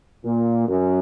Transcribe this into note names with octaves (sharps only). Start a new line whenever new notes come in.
A#2
F#2